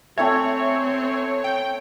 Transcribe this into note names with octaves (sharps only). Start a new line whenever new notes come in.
A3 C4 E4 C#5 E5 G5 G#5
C#5 G5